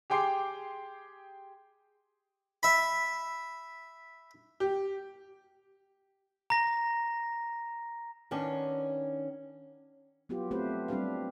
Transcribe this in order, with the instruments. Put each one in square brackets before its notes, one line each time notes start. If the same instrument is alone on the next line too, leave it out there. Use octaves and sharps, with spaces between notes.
[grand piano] G4 G#4 G5 C6 D6 C7
[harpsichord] E5 B5
[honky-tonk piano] G4
[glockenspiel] A#5 A#6
[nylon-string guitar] D#3 B3 C#4 D4
[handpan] F#3 B3 F4 G4
A3 C4 F4 G4 B4 C5
G3 C4 D4 G4 B4 F5